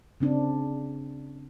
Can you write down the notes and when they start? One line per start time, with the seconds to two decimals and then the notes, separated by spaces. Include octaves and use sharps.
0.20 C#3 C4 D4